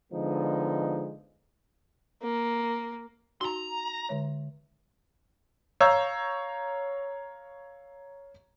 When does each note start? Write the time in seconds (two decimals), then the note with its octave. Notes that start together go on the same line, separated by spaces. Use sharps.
0.12 D3 F3 G#3 B3 D#4
2.22 A#3
3.41 D#4 F#4 A#5 C6
4.09 D3 G#3 C#5
5.80 C#5 F5 A#5 E6 G6